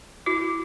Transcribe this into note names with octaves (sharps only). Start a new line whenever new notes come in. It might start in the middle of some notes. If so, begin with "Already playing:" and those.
E4 F#4